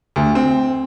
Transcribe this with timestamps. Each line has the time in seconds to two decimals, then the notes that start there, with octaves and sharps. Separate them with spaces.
0.16 D2
0.35 C4